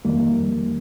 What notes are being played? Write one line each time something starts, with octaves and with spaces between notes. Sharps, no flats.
F2 D#3 G3 A#3